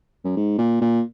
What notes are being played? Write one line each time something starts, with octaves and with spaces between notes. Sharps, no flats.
F#2
G#2
A#2
A#2